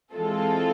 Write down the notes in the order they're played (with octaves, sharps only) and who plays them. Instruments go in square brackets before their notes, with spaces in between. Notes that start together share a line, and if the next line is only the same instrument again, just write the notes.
[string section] E3 G#3 C4 F4 A4